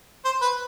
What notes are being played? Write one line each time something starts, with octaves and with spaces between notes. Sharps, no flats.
C5
B4